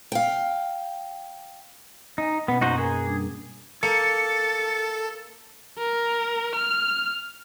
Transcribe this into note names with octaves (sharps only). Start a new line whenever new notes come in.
F5 G5
D#4 D#5 G#5
B2 A#3 B3 C#4
F#2 D#4 F#4 C5
G#4 A#4 G#5 A#5
G3 D4
A#3 A4 A6 C#7
A#4
F6